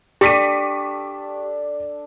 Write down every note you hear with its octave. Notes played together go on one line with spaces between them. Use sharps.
D4 G4 A4 D6 B6 D#7